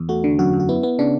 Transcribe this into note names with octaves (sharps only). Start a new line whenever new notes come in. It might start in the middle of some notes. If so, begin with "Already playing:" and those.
Already playing: E2
A3 F#4
D3
F#2 F#4
F#2
F#4
B3 E4
B3
C#3 D4